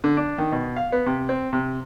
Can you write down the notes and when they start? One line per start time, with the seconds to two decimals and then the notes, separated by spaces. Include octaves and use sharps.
0.04 D3
0.17 D4
0.38 D#3
0.52 B2
0.76 F5
0.92 B3
1.06 C3
1.29 C4
1.53 C3